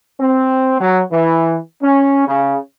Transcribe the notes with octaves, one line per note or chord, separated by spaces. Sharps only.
C4
F#3
E3
C#4
C#3